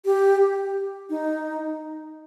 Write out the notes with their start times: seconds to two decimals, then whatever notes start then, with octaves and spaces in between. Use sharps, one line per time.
0.05 G4
1.10 D#4